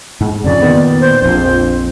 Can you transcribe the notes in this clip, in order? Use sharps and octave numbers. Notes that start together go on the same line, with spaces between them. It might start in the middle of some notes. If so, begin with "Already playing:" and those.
G#2
F2 C#3 D5
A#2 D#3 B3
C5
A#1 F2 C5